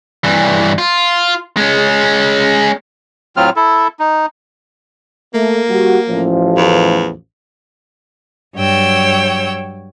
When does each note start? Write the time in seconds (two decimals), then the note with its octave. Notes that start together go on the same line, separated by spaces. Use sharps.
0.24 G2 E3
0.78 F4
1.57 G#3 C#4
3.37 A2 F#3 C4 F4 F6
3.56 E4 A4
3.99 D#4
5.34 A3 A#3
5.70 G3 F#4
6.09 A1 F3
6.57 E2
8.56 G2 F#3 C#5 G5 E6